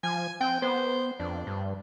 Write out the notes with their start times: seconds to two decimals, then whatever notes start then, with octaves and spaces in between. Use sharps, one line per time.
0.03 F3 G#5
0.41 C4 G5
0.62 B3 C5
1.20 F2 D4
1.47 G2